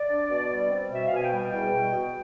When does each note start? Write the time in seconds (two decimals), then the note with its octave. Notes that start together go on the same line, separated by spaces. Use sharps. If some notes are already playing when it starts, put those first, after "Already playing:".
Already playing: D5
0.09 D4
0.30 B2
0.50 G3
0.70 C4
0.90 B2 E5
1.05 F5
1.11 B2 G#5
1.22 G5
1.32 G3
1.51 E2 G5
1.72 B2
1.92 B2